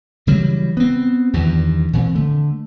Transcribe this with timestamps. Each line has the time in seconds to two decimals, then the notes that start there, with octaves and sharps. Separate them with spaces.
0.27 C#3 E3 F#3 G3
0.77 B3 C4
1.33 E2 G2 D#3 E3
1.93 A#2 E3 C4
2.15 D3 A3